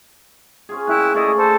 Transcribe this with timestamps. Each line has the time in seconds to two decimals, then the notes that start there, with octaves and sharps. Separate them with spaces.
0.69 C#4 F4 G#4
0.87 A#2 E4 F5 G5 F#6
1.14 A3 E4 G#4 D5 D#5
1.37 A4 C5